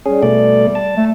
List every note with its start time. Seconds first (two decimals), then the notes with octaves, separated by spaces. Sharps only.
0.06 G3 C#4 G#4
0.23 B2 A3 D5
0.75 A5
0.97 A3